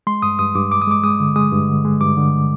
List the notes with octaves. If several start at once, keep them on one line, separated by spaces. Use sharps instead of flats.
G#3 C6
G2 D#6
G2 D#6
G2 D6
G2 D6
D#6
G#3 D6
G#3 D#6
D3
G#3 D#6
G2
D3
G#3
G2 D6
D3